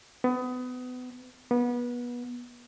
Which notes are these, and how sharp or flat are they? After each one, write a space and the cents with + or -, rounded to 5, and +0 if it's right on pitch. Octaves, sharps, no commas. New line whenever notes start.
B3 +30
B3 -25